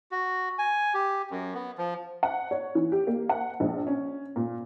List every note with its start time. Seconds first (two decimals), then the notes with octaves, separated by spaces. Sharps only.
0.12 F#4
0.59 G#5
0.94 G4
1.31 F#2
1.55 B3
1.78 F3
2.23 F#5
2.51 C#5
2.75 E3
2.92 G4
3.07 A#3
3.29 F#5
3.60 A#1
3.87 C#4
4.36 A#2